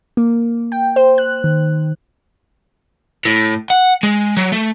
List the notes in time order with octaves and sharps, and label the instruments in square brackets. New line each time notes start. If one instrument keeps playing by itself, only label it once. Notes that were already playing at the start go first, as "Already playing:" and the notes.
[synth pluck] A#3
G5
C5
F#6
D#3
[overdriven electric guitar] A2
F#5
G#3
F#3
A3